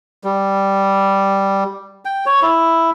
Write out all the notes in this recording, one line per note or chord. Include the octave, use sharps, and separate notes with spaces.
G3
G5
C#5
E4